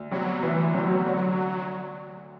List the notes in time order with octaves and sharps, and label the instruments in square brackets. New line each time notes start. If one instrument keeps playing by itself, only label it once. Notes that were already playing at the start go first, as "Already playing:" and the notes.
Already playing: [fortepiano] D2
[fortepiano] C3 G3 B3 [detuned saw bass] F#3
[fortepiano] D2 [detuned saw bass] E3
[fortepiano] C3 G3 B3 [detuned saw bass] F#3
[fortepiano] D3